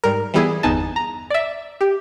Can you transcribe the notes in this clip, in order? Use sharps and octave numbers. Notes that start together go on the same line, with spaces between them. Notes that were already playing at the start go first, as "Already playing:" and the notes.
G#2 G3 A#4
E3 G3 B3 E4 G#4
G1 E2 B3 D#4 G#5 A5
A#5
D5 E5
G4